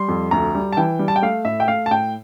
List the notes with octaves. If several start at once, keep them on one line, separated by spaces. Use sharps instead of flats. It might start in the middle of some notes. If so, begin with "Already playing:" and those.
Already playing: G3 C6
F2
D2 A#5
G3
A5
E3 G5
G3
A5
G5
A3 F5
A2 E5
G5
A3 F5
A5
A2 G5